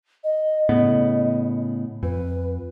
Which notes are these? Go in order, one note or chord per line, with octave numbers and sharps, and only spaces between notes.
D#5
A2 C#3 B3
F2 B4